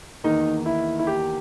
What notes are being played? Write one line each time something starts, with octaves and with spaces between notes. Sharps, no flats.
E2 D#3 A#3 D#4
E4
E4
G4